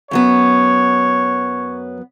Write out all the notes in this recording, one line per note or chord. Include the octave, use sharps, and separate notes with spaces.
F#2 F#3 B3 C#5